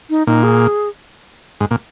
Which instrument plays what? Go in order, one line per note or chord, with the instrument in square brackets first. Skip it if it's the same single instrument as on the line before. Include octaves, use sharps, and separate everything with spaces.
[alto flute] D#4
[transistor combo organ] A#2 [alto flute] D#4
[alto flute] G#4
[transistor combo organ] G#2
A#2